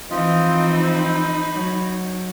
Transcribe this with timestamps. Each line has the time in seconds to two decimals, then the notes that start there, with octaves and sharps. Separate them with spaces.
0.11 E3 F3 C4 D#4 F4 D#5
0.77 B5
1.53 F#3